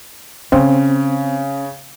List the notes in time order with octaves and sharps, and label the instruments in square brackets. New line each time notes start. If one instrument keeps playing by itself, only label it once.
[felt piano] C#3 [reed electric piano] C4 [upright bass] C#4